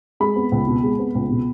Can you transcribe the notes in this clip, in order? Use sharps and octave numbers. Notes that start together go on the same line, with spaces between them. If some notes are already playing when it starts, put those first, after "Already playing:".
G#3 B5
B3
C#2
B2
G#3
B3
C#2
B2